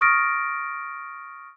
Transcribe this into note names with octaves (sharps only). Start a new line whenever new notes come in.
C#6 D#6 F6 A6 A#6 D7